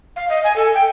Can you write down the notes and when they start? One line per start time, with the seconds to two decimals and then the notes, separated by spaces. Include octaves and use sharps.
0.16 F5
0.29 D#5
0.44 G#5
0.56 A4
0.75 G5